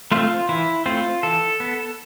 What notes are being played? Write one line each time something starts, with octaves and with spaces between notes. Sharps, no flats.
A3 C4 F4
E3 E4
A3 C4 F4
E3 A4
B3